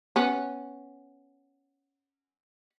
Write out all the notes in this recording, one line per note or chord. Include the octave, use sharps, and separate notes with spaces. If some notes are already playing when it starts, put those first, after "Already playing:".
B3 C#4